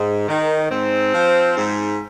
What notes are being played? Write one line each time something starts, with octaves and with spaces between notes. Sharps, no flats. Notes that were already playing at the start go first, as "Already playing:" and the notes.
Already playing: G#2
D#3
G#2 C4
F3
G#2